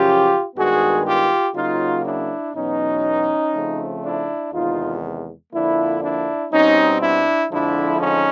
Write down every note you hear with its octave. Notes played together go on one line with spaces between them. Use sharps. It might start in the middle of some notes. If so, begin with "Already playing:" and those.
Already playing: F#2 C#3 F3 F4 G4
G2 D#3 G#3 B3 F#4 G#4
F4 G4
C#3 F#3 A#3 D#4 F4
D4 E4
E2 B2 F#3 B3 C#4 D#4
C#3 F3 A3 C4
D4 E4
E2 C3 D#3 G#3 D#4 F4
F2 D3 F3 A#3 D4 E4
D4 E4
B2 G3 C4 C#4 D#4
D4 E4
F2 D3 F3 G#3 D4 E4
C#4 D#4